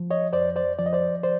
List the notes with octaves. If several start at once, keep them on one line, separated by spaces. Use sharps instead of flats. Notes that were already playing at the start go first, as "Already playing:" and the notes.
Already playing: F3
C#5 D#5
F2 C5 D5
C5 D5
F3 D5
D#5
C5 D5
C5 D5